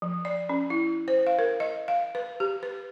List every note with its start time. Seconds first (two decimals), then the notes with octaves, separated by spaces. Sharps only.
0.02 F3
0.25 D5
0.49 C#4
0.70 E4
1.08 C5
1.27 F5
1.39 A#4
1.60 D#5
1.88 F5
2.15 B4
2.40 G4
2.63 B4